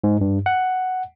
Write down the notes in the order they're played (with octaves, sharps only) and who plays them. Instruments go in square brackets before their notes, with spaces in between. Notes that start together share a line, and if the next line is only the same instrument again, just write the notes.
[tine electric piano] G#2
G2
F#5